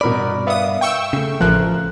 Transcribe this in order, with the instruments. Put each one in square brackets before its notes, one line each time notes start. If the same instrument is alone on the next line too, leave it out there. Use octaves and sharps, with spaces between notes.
[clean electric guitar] G2 D5 [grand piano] B2 A#4 B5
[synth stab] B3 D#6 [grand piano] E5 F5
[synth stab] G5 C#6 E6
[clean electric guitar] C#3 A3
[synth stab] A1 F3 [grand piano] A#4 F#6